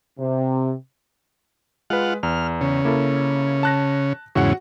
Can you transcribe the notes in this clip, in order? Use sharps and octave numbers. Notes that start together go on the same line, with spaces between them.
C3
G#3 F4 B4 F#5
E2 F6
C#3
A#3 E4 A4
A5 F#6 A#6
E2 G#2 C#3 F#4 F#5